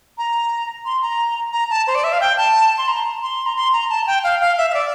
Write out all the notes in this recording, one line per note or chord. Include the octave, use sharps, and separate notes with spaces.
A#5
C6
A#5
A#5
A5
C5
D5
E5
F5
G5
A5
C6
A#5
C6
A#5
C6
A#5
A5
G5
F5
F5
E5
E5
D5